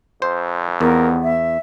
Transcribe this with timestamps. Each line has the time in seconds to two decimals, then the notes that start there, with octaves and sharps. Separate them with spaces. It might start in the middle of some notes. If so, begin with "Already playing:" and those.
0.22 F2 C5
0.81 E2 B3 A#4
1.23 E5